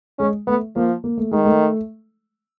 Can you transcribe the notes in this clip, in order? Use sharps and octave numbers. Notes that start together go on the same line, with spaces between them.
G#3 C#4
A3 B3
F3 A#3
A#3
A3
D#3 G#3
A3